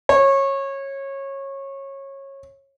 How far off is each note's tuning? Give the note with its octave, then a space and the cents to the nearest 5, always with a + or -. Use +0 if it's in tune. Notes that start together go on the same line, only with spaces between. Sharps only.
C#5 -20